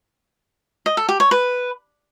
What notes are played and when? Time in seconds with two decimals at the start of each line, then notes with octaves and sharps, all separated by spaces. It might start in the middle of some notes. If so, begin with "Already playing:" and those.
0.86 D#5
0.97 A4
1.09 G4
1.20 C#5
1.31 B4